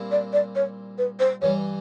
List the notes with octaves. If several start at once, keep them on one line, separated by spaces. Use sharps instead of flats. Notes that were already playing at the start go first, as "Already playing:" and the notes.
Already playing: A#2 G3 C4 E4
D5
D5
C#5
B4
C5
G2 E3 G3 C#5